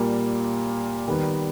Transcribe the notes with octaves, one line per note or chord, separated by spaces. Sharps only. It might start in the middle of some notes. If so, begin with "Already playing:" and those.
Already playing: A#2 G3 A#3
D#3 G3 B3